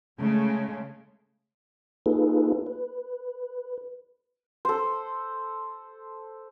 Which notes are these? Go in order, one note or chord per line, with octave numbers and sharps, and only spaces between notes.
C#3 G#3 A3
A#3 D#4 F4 G#4 A4 B4
B4
A4 C5